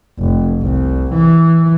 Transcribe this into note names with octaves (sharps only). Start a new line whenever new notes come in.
F1
C2
E3